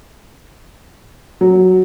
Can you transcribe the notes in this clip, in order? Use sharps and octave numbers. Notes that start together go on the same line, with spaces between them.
F#3